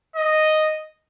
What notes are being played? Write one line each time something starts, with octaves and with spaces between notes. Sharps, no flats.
D#5